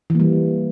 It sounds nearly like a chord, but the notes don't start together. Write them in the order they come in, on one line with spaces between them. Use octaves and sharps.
E3 A#3 G3